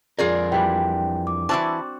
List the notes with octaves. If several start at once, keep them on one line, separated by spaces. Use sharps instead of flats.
F2 F4 G#4 A#4 D5
E3 G3 D4 G5
D6
E3 C4 E4 F#4 D5 A5